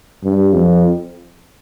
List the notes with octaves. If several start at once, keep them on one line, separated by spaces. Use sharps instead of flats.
G2
F2